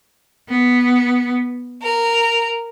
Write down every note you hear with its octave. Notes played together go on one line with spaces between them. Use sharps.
B3
A#4